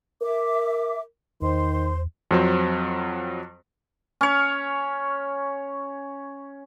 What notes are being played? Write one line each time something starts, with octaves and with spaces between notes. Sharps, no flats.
A#4 E5 D6
E2 D#3 C5 C6
F2 F#3 C4
C#4 C#5